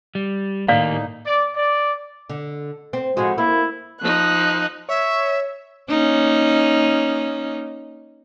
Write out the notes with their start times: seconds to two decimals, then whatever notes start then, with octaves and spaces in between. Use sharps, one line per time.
0.15 G3
0.68 A2 D#3 A#3 D#4 D5 F5
1.26 D5
1.56 D5
2.30 D3
2.93 C4
3.17 A2 F3 G#3 F#4
3.38 A#3 E4
4.02 F3 D#4 F#6
4.89 C#5 E5
5.90 A#3 C#4 D#4